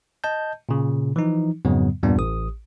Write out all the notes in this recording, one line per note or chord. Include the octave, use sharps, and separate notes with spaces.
D#5 A5 G6
A#2 C#3
E3 F3 D#4
F2 G#2 C#3 F#3 B3
E2 G2 A#2 G3 B3 D4
A1 D#6